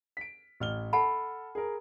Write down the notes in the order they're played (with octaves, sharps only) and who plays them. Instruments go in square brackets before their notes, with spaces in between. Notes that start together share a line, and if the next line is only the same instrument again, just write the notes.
[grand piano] B6 D7
A1 F6 G7
[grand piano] A4 [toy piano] F#5 A5 B5
[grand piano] G#4 A#4